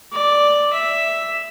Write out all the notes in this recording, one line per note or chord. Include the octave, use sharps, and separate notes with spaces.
D5
E5